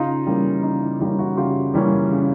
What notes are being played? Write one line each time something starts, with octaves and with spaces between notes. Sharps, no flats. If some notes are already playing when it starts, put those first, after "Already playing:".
Already playing: C#3 D#4 F4
E3 G3 A#3 C#4
C#3 D#4
E4
E3 G3 A#3 C#4 D#4 F4
E4 F#4
C#3 F4 G4
E3 G3 A#3 C#4
C#3